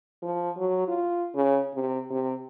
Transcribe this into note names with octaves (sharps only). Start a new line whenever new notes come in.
F3
F#3
F4
C#3
C3
C3